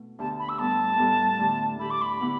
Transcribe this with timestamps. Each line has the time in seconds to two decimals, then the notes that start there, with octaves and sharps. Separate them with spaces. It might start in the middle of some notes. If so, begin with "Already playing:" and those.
Already playing: B2 A3 E4
0.19 D2 D3 B3 G4 A5
0.39 B5
0.49 E6
0.59 A2 G3 B3 A5
0.99 A2 G3 B3
1.39 D3 A3 G4
1.79 D3 A3 G4 B5
1.91 D6
2.02 B5
2.20 D3 B3 E4 G4